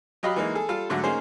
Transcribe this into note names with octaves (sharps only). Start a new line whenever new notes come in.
F#3 G4 D#5 F5 B5
E3 G#3 A#3 D#4
G#4 A4
G3 F4 A4 F5
G#2 D3 F#3 A3
A#3 C#4 D#4 G#4 C5